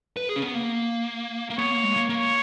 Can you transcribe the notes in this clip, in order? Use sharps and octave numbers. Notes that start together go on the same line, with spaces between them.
B4
G#4
C#4
B3
A#3
A#3
B3 C#5
A#3
G#3
A#3
A#3 C#5